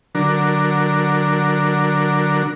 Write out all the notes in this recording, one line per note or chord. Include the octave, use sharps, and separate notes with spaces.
D3 F#3 D4 A#4